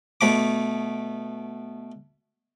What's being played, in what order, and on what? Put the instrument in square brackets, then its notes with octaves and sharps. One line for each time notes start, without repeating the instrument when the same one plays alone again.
[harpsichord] B2 A3 B5 D6